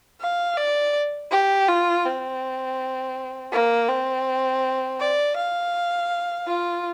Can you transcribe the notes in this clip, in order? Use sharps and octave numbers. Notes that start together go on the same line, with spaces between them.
F5
D5
G4
F4
C4
A#3
C4
D5
F5
F4